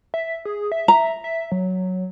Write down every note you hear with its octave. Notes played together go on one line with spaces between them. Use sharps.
E5
G#4
E5
A#5
E5
F#3